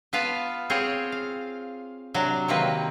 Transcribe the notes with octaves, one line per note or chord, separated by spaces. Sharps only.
B3 F4 B4 F5 A5
C4 F4 G#4 C5 C#5
F5
C3 F#3 D4 F#4
C3 D#3 A#3 C4 B4